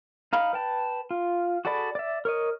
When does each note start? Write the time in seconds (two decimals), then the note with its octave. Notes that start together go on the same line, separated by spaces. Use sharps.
0.33 D#4 F5 B5
0.53 B4 G5 A5
1.11 F4
1.65 F#4 G#4 A4 D5 B5
1.95 D5 E5
2.25 A#4 C#5 D#5